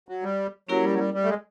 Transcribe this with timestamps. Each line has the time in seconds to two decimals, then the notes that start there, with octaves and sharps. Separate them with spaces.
0.09 F#3
0.23 G3
0.69 F#3 A#3 C#4 E4 G4 A#4
0.84 G3
0.94 F#3
0.98 G3
1.14 G3
1.24 A3
1.29 G#3